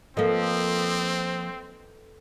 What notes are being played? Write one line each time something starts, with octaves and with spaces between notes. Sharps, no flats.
F3 A#3 C4 A4 B4 D#5